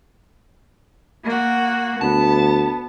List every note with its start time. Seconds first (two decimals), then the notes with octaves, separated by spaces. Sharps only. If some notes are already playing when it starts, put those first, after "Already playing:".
1.25 A#3 F#4
2.01 D2 B3 A5